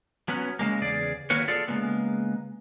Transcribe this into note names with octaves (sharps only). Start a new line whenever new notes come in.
F#3 B3 C#4
C#3 G#3 A#3
E2 C#3 G#4 D5
D#3 F#3 A#3 A#4 B4 C#5
F4 G#4 A4 D5
C#3 G#3 A#3 B3